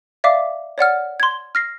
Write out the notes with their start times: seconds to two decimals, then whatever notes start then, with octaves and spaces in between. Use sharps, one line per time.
0.24 D5 E5 F5 D6
0.78 C#5 D5 F#5 F6
1.20 C6 G#6
1.55 F6 A#6 C7